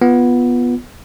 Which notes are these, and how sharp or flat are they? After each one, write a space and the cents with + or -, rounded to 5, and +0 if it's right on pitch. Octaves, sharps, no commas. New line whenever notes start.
B3 -10 F4 +0